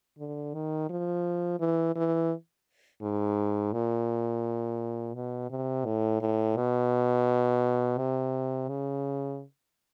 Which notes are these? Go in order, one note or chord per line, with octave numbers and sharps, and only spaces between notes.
D3
D#3
F3
E3
E3
G#2
A#2
B2
C3
A2
A2
B2
C3
C#3